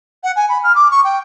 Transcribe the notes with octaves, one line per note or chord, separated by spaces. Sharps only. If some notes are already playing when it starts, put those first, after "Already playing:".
F#5
G#5
B5
F6
D6
C#6
G5